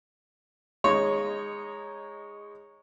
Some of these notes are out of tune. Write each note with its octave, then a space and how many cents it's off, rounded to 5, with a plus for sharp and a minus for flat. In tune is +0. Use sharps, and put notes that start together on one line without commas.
G#3 -15 D#4 +0 C#5 +0